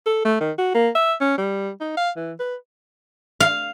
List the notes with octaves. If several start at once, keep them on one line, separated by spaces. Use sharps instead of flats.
A4
A3
D#3
F#4
A#3
E5
C#4
G3
D#4
F5
E3
B4
F5